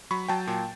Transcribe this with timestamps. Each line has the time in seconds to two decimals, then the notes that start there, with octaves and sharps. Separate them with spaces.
0.11 F#3 B5 C#6
0.29 F#3 G5 A5
0.47 A#2